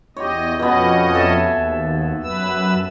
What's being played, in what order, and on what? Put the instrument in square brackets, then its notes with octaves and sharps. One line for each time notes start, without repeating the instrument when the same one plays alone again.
[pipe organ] E2 D#5 [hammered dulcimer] G4 C#5
[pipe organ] F2 C#4 D#5 [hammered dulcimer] B2 B3
[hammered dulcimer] A4 E5 G#5
[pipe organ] D#2
F#2 B4 E6